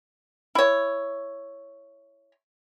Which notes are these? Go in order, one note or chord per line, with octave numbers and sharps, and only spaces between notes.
E4 C#5